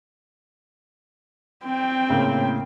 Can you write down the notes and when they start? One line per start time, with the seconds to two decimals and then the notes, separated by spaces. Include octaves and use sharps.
1.65 C4 G5
2.09 A2 C#3 A#3